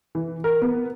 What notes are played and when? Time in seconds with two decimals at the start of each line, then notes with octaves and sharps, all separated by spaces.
0.15 E3
0.44 A#4
0.62 B3